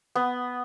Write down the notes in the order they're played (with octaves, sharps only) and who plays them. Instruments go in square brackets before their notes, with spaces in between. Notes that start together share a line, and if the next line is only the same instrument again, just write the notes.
[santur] B3